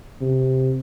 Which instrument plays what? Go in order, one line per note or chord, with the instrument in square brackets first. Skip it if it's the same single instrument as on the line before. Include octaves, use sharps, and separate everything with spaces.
[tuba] C3